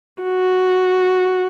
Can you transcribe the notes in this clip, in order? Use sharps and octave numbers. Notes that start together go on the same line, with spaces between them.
F#4